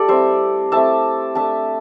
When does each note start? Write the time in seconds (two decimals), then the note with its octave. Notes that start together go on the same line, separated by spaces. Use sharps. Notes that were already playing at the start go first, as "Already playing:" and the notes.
Already playing: A3 G4 A4 D5
0.08 G3 C4 E4 C5 E5
0.72 A3 C4 E4 E5 A5
1.35 A3 D4 E5 A5